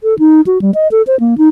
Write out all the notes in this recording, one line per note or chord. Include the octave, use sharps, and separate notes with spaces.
A4
D#4
F#4
G3
D#5
A4
C5
A#3
D#4